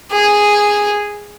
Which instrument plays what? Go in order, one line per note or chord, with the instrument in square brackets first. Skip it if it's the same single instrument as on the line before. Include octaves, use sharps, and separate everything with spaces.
[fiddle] G#4